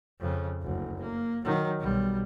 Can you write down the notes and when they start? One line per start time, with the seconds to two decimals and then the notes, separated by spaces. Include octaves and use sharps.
0.21 F2 C#3
0.62 F#1 D2
1.02 A#3
1.44 D#3 F#3
1.80 B1 G3